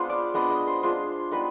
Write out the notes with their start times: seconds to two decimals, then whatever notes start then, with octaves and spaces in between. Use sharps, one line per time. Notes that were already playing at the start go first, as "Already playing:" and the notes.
Already playing: G#3 B3 D4 F4 C5 F5
0.09 D5
0.34 G#3 B3 D4 D#5
0.50 D#5
0.67 C5
0.83 G#3 D4 F4 C5
1.31 G3 B3 D#4 B4